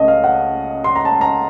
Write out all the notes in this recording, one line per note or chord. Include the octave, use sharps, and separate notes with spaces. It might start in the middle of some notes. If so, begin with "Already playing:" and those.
Already playing: C#2 C#3 A3 C#4 D#5 A5
F5
F#5
C6
A#5
A5
A#5